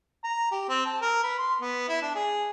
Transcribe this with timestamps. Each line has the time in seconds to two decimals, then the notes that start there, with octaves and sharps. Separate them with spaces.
0.24 A#5
0.51 G4
0.69 C4
0.85 A5
1.01 A#4
1.24 B4
1.38 C6
1.61 B3
1.88 E4
2.02 D4
2.15 G#4